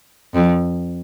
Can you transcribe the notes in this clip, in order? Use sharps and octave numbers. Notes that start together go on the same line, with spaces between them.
F2